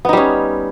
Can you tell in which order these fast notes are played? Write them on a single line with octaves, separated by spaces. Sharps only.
B3 D#4 G3 C#4